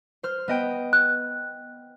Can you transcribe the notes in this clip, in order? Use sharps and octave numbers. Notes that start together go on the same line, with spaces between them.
C5 F6
B3 D#5 G5
F#6